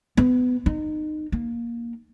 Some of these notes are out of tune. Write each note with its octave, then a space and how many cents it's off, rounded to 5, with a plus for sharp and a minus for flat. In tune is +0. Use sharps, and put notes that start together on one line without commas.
B3 +20
D#4 -25
A#3 +10